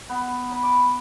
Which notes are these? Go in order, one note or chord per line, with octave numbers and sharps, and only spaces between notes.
B3
B5
D6